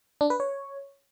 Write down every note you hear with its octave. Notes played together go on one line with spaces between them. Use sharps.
D4
B4
C#5